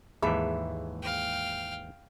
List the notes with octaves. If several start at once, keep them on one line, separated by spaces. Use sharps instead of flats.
D#2 G#2 E3 G#4 A4 E5 B5
F5 G5